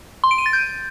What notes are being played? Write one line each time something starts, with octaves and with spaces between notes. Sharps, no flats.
C6
D7
D#7
A6
G6